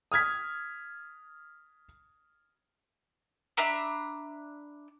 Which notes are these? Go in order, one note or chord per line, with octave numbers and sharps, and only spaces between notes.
D#6 F6 G#6 B6
D4 E5 A#5 B5